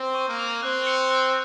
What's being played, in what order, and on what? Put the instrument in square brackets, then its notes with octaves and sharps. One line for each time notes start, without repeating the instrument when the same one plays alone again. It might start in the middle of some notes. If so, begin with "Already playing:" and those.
Already playing: [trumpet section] C4
[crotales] C#6
[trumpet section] A#3
[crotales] F7
[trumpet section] C4 [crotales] F#6
[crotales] C#7
F#6